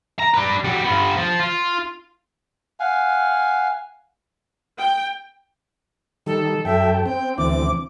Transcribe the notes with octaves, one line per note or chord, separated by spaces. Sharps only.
A#5
D4 B4
G3 F#4
G2 B3
F3
F4
F5 F#5 G#5
G5
D#3 G3 A4
F#2 A4 E5 G5
C4 G5
D2 E3 C4 D6